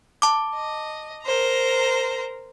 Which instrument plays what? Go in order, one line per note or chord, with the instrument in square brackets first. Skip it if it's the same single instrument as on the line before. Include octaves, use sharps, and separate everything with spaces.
[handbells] A5 D6
[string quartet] D#5
A#4 C5 A#5